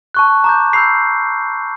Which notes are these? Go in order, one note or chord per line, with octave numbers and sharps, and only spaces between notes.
A5 C#6 F#6
A#5 D6 G6
B5 E6 G6 C7